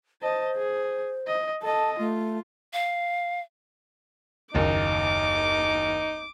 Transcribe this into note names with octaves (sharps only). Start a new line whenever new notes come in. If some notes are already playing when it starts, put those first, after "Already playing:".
C5 D#5 A5
G#4
D#5
A4 D#5 A5
A3 F4
F5
F#1 D#2 D#4 D6